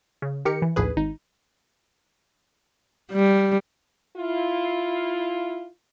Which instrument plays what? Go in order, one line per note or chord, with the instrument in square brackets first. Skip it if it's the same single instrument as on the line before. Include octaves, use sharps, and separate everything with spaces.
[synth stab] C#3
D#3 G4 A#4 C#7
E3
A#1 D#2 A2 G#4 B4
G#1 D#4
[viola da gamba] G3
[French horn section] E4 F4